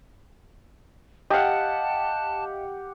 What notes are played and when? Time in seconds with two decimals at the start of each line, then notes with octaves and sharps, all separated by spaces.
1.30 G4 D#5 F5 F#5 A5